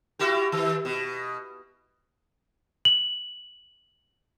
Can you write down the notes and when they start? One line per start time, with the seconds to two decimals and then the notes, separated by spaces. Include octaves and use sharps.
0.19 E4 F#4 G4
0.52 D#3
0.85 B2
2.85 F#7